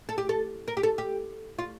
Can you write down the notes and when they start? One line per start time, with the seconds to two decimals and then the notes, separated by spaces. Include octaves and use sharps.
0.09 A4
0.18 G4
0.29 A4
0.68 A#4
0.77 G4
0.83 A4
0.98 G4
1.59 F4